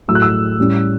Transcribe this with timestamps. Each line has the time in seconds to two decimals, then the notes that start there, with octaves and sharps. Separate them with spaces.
0.08 A2 F#3 A3 E6
0.15 F#6
0.22 E6
0.59 A2 G3 C#4